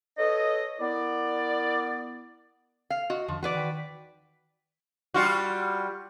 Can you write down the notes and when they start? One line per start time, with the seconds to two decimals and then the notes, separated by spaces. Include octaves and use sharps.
0.18 A4 B4 C#5 D#5
0.80 B3 E4 A#4 D5
2.90 F5
3.10 F#4 D#5
3.28 E2 D3 F3
3.43 E3 F#4 B4 D5
3.55 D#3 G5 B6
5.14 G3 F4 F#4